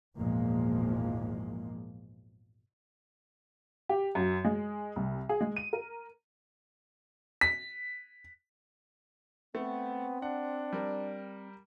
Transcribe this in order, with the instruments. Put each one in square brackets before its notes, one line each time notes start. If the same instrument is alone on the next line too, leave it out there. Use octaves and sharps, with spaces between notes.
[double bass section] G#1 E2 A#2 F3 G#3 A#3
[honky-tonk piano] G4
F#2
G#3
C2
G#4
G#3
D#7
A#4
B6
[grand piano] A3 [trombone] B3 [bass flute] C4
[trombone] D4 [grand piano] F#5
[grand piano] G3 A#4